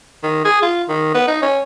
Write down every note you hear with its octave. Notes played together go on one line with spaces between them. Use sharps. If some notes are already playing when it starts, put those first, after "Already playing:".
D#3
G#4
F4
D#3
B3
D#4
C#4